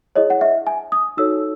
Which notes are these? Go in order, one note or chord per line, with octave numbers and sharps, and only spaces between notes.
E4 G#4 C#5 D#5
F#5
E5
G#5
D#6
D#4 F#4 A4 C#5 E6